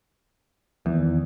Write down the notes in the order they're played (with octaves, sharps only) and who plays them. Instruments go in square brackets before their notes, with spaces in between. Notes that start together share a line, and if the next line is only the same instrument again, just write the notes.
[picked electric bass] E2 [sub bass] D#3